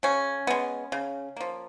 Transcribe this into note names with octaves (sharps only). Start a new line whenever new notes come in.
C#3 C#4
G#3 B3
C#3
F3 A#3